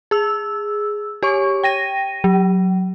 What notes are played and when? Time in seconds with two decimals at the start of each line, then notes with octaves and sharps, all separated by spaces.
0.11 G#4 E6
1.23 G4 C#5 C#6
1.64 G5 A#6 D#7
2.24 F#3